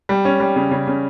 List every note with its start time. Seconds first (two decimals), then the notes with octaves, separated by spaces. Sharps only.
0.09 G3
0.25 C#4
0.40 G3
0.56 C#3
0.71 C#3
0.87 C#3